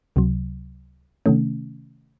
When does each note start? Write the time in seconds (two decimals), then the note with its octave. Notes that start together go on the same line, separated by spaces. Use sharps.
0.16 C#2 C3 F#3
1.26 C3 D#3 A3 C#4